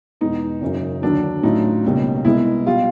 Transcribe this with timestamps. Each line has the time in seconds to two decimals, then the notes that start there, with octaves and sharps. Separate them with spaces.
0.21 E2 B2 G#3 B3 D#4
0.61 F#1 F#2 C#3 F#3
1.02 D#2 D3 F#3 D4
1.43 A2 F#3 A3 C#4 D#4 F4
1.84 C#2 B2 G3 A#3 C#4
2.25 C2 B2 G#3 B3 E4
2.66 B2 G3 F4